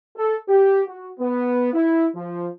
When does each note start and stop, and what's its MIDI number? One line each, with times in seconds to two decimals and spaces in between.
0.16 0.36 69
0.48 0.81 67
0.86 1.08 66
1.20 1.69 59
1.73 2.07 64
2.15 2.47 53